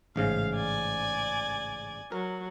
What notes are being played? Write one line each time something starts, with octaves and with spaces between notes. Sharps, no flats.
A1 G#2 C#3 F5
D5 G#5
F#3 A#4